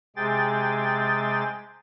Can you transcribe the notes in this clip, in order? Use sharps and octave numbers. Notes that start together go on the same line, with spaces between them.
C3 G#3 G#4 G5 A6